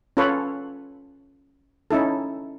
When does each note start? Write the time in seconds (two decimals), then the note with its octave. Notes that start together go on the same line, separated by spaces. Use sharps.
0.17 C#4 F4 A4 B4 C#5
1.91 C#4 D#4 E4 A4